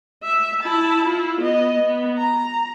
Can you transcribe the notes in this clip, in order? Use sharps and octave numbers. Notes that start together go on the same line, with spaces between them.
E5
E4 A5
E4 F4
B3 D#5
B3
A#5